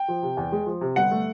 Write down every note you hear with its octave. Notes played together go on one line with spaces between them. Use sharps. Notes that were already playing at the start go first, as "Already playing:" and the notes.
Already playing: G5
F3
C3
E2
G#3
F3
C3
G1 F#5
A3